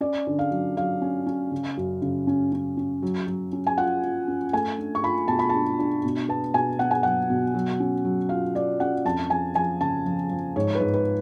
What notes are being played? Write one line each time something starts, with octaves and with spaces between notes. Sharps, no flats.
C#4 D5
D3
F5
F#3
F#3 F5
C#4
C#4
C#3
F#2
C#3
C#4
C#4
C#4
F#3
F#3
C#4
G#5
F4 F#5
F4
C#4
A3 G#5
D4
C#6
F4 B5
B2 A5
B5
D4 A5
D4
B2
B3 A5
B2 G#5
B2 F#5
G#5
F#3 F#5
B2
F#3
C#4
F#3
F4 F5
F4 D5
C#4 F#5
F2 A5
F3 G#5
F3 G#5
C#3 A5
F3
F3
G#2 C#5
B4
G#2
B4